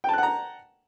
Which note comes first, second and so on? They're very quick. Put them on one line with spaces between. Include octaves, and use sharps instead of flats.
G5 A5 F#6 F#5 A#5